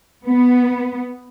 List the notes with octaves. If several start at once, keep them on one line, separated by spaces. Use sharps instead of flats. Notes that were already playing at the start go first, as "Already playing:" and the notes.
B3